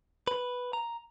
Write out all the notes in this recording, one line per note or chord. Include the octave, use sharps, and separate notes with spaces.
B4
A#5